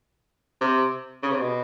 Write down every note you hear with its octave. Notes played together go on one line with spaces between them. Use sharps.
C3
C#3
C3
B2